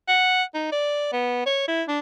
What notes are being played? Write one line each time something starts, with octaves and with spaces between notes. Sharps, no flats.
F#5
D#4
D5
B3
C#5
E4
D4